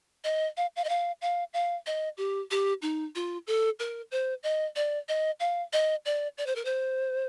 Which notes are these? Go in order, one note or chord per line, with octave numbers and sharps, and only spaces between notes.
D#5
F5
F5
D#5
F5
F5
F5
D#5
G4
G4
D#4
F4
A4
A#4
C5
D#5
D5
D#5
F5
D#5
D5
D5
C5
A#4
C5